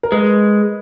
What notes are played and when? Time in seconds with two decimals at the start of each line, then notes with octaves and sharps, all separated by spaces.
0.03 A#4
0.12 G#3 B4